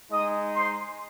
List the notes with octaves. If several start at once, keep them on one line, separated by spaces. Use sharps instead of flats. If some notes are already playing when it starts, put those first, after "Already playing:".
G#3 D#4 D#5 D#6
C5 C6